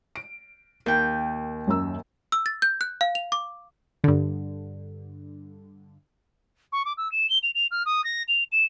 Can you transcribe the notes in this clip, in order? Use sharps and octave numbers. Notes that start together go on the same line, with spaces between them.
D7
D#2 A#4 G5
F#2 A#5 E6
E6
A6
G6
F#6
F5
F7
D6
G2 D3
C#6
D6
E6
E7
G7
F7
F7
F6
D#6
A#6
F7
E7